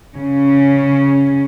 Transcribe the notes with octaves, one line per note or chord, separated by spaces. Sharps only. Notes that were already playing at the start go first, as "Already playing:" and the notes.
C#3 C#4